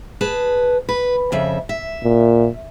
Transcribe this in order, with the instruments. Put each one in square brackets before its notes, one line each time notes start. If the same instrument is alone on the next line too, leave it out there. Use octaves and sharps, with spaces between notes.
[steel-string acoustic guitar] G#4 B4 A5
B4
F2 C#3 E5
E5
[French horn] A#2